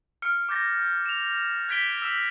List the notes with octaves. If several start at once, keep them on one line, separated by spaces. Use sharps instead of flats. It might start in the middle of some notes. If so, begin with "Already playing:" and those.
F6 C#7
D6 G6 A6 A#6
E7 F7
F#6 G#6 B6 D7 G7
E6 E7